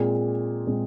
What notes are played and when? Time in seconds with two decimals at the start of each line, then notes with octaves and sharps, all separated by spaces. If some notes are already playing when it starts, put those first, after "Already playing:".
Already playing: A#2 G#3 C4 G#4
0.66 A#2 G#3 C4